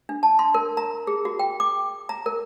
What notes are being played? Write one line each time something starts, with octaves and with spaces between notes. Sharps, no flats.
D4
A5
C6
A#4
A#5
G#4
F#4
G5
D6
A#5
A#4